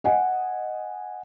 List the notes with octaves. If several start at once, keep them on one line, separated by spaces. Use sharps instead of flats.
D#5 F#5 G#5